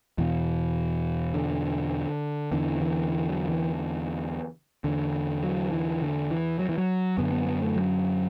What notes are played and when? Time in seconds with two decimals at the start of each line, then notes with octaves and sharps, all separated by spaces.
0.18 E2 B2 E3
1.34 D3
2.52 E2 D3 E3
2.81 E3
3.10 E3
3.29 F#3
3.49 E3
4.84 E2 D3
5.43 F#3
5.71 E3
6.02 D3
6.31 E3
6.59 F#3
6.69 E3
6.78 F#3
7.18 F#2 D3 B3
7.32 B3
7.46 B3
7.62 A3
7.76 F#3